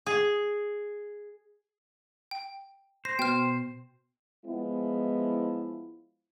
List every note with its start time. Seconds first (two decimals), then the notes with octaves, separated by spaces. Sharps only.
0.06 G#4
2.31 G5
3.05 C5 A#6
3.19 B2 G5 F6
4.45 F3 G#3 B3 E4